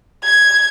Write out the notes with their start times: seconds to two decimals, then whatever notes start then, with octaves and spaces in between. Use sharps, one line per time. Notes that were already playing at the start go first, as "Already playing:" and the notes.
0.24 G#6